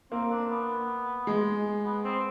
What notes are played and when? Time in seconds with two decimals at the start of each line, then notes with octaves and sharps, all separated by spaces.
0.11 A#3 C4
0.30 D4
0.50 B3
1.27 G#3
1.85 B3
2.05 C4